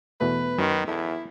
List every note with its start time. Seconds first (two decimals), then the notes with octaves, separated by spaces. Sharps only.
0.21 E2 B2 A3 B4
0.58 F#2 D#3 C#5
0.88 E2 E4 A4